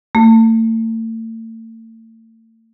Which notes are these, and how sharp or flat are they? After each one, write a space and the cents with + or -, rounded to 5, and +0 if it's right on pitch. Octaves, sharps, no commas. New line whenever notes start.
A3 +40